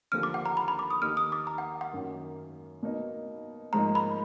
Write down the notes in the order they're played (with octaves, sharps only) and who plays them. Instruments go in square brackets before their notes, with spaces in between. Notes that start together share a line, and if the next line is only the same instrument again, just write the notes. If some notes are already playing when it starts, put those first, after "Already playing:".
[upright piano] D#2 D3 F3 A#3 D4 [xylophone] F6
[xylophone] D6
F#5
A#5
B5
B5
D6
D#6
[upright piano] D#2 D#3 A#3 D#4 [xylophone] F6
[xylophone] D#6
D6
A#5
F#5
F#5
[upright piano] F#2 D#3 A#3
B2 A#3 D#4
[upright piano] G#2 F3 A#3 D#4 [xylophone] A#5
[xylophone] B5